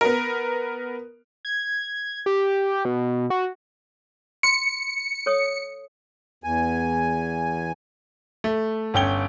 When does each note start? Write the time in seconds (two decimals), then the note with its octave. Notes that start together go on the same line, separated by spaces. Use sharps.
0.01 B3 A#4
1.45 G#6
2.26 G4
2.85 B2
3.30 F#4
4.43 C6 C#7
5.26 A4 C#5 D#6
6.44 E2 G#5
8.44 A3
8.94 G1 C#4 G5 G7